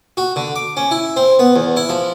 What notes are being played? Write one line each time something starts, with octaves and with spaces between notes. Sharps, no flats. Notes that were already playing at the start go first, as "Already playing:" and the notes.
F#4
D3
D6
C#4
E4
C4
B3
E2
E4
F3